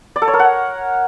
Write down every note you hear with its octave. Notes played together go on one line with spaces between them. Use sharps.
D5
A4
C#5
A#4
F#5